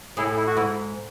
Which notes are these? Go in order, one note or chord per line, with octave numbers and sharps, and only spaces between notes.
A2 E4 G#4
E4
F#4
G#2 E4